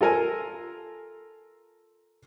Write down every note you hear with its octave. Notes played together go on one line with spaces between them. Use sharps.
F4 A4 A#4 G#5